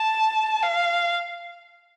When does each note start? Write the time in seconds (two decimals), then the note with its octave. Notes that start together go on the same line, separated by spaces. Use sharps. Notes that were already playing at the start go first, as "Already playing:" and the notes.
Already playing: A5
0.63 F5